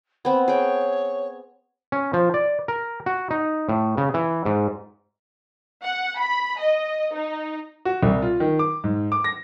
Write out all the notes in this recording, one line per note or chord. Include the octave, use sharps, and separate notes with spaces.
B3 C4 B5
G#4 C#5 G5
C#4
F3
D5
A#4
F#4
D#4
A2
C#3
E3
G#2
F#5
B5
D#5
D#4
F#4
C2
F4
D#3
D6
G#2
D6
A#6